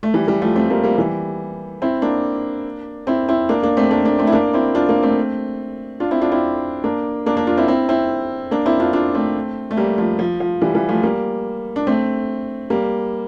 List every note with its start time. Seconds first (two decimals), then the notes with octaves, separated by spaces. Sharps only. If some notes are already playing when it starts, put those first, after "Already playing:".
0.03 A3
0.14 E3 G3
0.28 E3 G3
0.42 F3 A3
0.56 A3 C4
0.70 G3 A#3
0.83 G3 A#3
0.98 E3 G3
1.82 C4 E4
2.02 A#3 D4
3.07 C4 E4
3.28 C4 E4
3.49 A#3 D4
3.63 A#3 D4
3.77 A3 C4
3.91 A#3 D4
4.05 A#3 D4
4.19 A3 C4
4.27 E4
4.32 A#3 D4
4.53 C4 E4
4.75 D4 F4
4.89 A#3 D4
5.03 A3 C4
6.00 D4 F4
6.11 C4 E4
6.21 D4 F4
6.32 C4 E4
6.84 A#3 D4
7.26 A#3 D4
7.37 A#3 D4
7.47 D4 F4
7.57 C4 E4
7.68 C4 E4
7.89 C4 E4
8.51 A#3 D4
8.66 C4 E4
8.80 D4 F4
8.93 D4 F4
9.14 A3 C4
9.71 A3
9.77 G3 A#3
9.98 F3 A3
10.19 F3
10.40 F3
10.61 E3 G3
10.75 E3 G3
10.89 F3 A3
11.03 G3 A#3
11.76 D4
11.87 A3 C4
12.70 G3 A#3